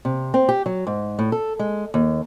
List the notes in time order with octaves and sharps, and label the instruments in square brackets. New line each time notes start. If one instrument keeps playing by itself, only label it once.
[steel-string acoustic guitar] C3
C4
G4
F#3
G#2
A2
A4
G#3
D#2